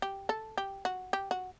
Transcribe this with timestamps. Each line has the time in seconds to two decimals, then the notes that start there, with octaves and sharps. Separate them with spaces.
0.02 G4
0.29 A4
0.58 G4
0.85 F#4
1.13 G4
1.31 F#4